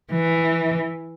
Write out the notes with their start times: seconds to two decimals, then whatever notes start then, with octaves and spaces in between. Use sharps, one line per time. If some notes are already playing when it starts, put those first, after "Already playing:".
0.11 E3